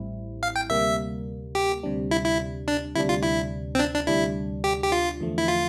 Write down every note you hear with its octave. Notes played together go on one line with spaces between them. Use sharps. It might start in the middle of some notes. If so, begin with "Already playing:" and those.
Already playing: A1 A2 G3 C4 E4
F5
G5
D2 C3 G3 A#3 E5
G4
D2 C3 G3 D4
E4
E4
D4
D2 C3 G3 D4 E4
F4
E4
C4
D4
D4
D2 C3 G3 D4 E4
G4
G4
F4
E2 D3 F3 A3
E4
F4